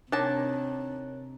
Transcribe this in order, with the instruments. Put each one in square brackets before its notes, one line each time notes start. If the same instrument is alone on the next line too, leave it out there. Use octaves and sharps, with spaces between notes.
[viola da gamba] C3 [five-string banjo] D#3 A5 [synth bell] D4 [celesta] C#5 F#6